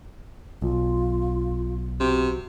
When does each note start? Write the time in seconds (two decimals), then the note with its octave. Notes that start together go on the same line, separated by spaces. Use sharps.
0.62 B1 F4
2.00 C3 F#4